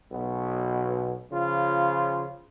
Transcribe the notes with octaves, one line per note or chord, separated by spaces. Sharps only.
B1 B2
C#3 F3 F4